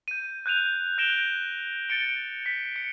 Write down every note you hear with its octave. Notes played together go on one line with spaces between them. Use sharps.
G6 D#7
F#6 G6 D#7 F7
F#6 A#6 D7 E7 G7
A6 C#7 D7 G7
B6
C#7